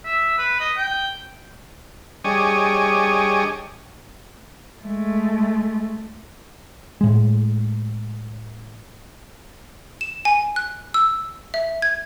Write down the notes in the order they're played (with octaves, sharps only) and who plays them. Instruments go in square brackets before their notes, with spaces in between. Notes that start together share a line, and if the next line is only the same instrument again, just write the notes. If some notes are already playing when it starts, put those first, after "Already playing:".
[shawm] E5
B4
D#5
G5
[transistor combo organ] G3 D4 G#4 C#5 D#5
[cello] G#3 A3
[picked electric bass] A2 G#3
[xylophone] E7
G#5
F#6
E6
E5
G#6